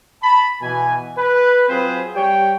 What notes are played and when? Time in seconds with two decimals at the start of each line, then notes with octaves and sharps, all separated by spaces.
0.23 A5 B5
0.62 B2 E3 G#5
1.18 B4
1.68 F#3 C4 F4 G#4 B4 C5
2.15 G3 G4 C#5 G5